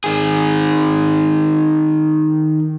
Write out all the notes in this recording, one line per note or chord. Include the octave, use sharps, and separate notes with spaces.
D#3 G#4